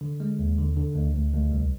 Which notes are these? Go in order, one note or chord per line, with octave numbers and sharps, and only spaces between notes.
D3
G#3
D#2
D3
D3
D2
D2
D2
C2